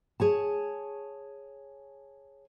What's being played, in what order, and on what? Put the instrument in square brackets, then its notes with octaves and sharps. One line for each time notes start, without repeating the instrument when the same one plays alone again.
[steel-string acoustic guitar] G#4 C#5 A5